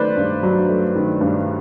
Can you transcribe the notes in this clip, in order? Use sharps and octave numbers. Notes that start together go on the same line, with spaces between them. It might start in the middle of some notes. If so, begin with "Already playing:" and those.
Already playing: D#3 F#3 A3 B4 C5 D5
G2
F#3
A3
D#3
G2